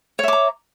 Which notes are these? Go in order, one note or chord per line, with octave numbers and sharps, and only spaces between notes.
C#5 E5 A#5 D6